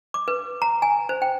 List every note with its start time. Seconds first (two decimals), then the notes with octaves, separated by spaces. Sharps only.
0.14 D6
0.28 B4
0.62 A#5
0.82 G#5
1.09 C5
1.22 G5